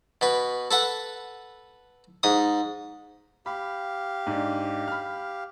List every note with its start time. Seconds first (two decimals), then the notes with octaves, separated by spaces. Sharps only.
0.21 B2 B4
0.71 A4 B4 F#5
2.23 G#2 D#6
3.46 G4 F5 B5
4.27 G#2 D4
4.88 B5 F6